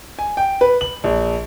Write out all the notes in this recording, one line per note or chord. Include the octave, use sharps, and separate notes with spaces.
G#5
G5
B4
F#7
A#1